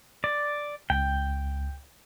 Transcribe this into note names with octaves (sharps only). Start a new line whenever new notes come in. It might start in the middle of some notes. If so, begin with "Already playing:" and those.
D5
C#2 G5